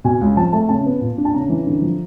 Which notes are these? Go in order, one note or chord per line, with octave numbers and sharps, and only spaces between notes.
B2 G#5
C#2
F3 A5
A3 A5
C#3 A5
B3
A#2
D4
A5
C#3 A#5
E3
D3
F3